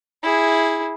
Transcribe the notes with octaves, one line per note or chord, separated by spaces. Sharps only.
E4 G#4